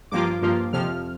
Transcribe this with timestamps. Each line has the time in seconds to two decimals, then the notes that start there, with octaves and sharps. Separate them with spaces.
0.11 G2 F3 A#3 F4 D6
0.42 G2 F3 A#3 F4
0.73 F2 C3 F3 F6